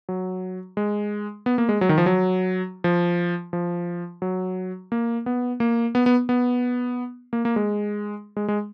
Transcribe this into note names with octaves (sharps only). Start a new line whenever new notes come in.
F#3
G#3
B3
A#3
G#3
F#3
D#3
F3
F#3
F3
F3
F#3
A#3
B3
A#3
B3
B3
B3
A#3
A#3
G#3
G#3
G#3